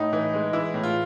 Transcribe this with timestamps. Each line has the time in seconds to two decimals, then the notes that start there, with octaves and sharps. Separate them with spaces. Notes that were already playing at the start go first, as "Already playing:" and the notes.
Already playing: A2 D#4
0.13 E3
0.33 G#3
0.53 E3 E4
0.74 A2
0.83 F4